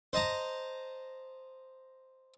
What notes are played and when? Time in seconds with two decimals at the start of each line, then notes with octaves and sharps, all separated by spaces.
0.13 C5 D#5 A5 A#5